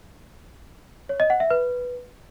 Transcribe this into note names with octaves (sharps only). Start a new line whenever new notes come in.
C#5
D#5
F#5
E5
B4